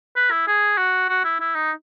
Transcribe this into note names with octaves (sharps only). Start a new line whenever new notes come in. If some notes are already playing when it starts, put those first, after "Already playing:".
B4
E4
G#4
F#4
F#4
E4
E4
D#4